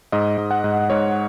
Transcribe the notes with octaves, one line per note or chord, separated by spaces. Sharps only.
G#2 D#5
G#2
F#5
G#2
G#2 C#5